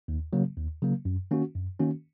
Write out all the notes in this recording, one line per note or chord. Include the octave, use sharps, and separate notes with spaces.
D#2
C#3 F#3 A#3
D#2
C#3 F#3 A#3
F#2
D#3 A#3 C#4 F#4
F#2
D#3 A#3 C#4 F#4